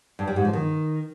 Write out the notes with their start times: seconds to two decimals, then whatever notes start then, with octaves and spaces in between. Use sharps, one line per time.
0.19 G2
0.27 G3
0.36 G#2
0.45 F3
0.53 D#3